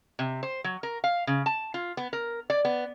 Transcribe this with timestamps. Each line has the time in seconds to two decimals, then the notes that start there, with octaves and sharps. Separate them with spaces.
0.19 C3
0.43 C5
0.64 F#3
0.83 A#4
1.04 F5
1.27 C#3
1.46 A5
1.74 F4
1.97 B3
2.13 A#4
2.50 D5
2.65 B3